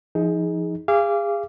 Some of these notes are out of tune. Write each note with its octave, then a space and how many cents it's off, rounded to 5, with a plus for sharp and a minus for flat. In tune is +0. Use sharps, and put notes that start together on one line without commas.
F3 -30 D#4 +20 G#4 +0
G#4 -30 F5 -25 D6 -15